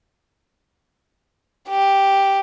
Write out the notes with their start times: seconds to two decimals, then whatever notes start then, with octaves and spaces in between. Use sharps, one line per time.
1.69 G4